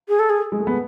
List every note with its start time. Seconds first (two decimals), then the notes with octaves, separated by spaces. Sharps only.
0.08 G#4
0.19 A4
0.30 G#4
0.52 G#3
0.60 A3
0.67 B3